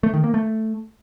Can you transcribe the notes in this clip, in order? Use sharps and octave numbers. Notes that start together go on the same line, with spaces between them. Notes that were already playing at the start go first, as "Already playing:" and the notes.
A3
D#3
A#3
A3